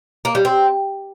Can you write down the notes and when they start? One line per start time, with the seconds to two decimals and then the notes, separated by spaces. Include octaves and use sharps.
0.25 A#3
0.35 G3
0.45 C4